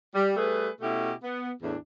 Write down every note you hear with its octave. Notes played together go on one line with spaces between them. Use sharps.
G3
G3 A3 G#4 B4
B2 A3 C#4 E4 G4
B3
E2 A2 E3 D4